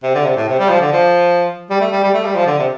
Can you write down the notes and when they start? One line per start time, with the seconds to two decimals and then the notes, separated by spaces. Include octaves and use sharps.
0.03 C3
0.15 D3
0.25 C3
0.37 A2
0.48 C3
0.59 G3
0.70 F3
0.81 D3
0.92 F3
1.70 G3
1.81 A3
1.92 G3
2.04 G3
2.14 A3
2.25 G3
2.36 F3
2.47 D3
2.59 C3